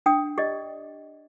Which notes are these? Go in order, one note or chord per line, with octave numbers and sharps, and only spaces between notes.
D4 G5 D#6
G4 D5 D#5